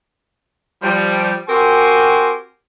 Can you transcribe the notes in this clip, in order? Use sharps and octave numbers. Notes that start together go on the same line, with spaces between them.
F3 G3
C4 F#4 G4 A#4 G#5 C6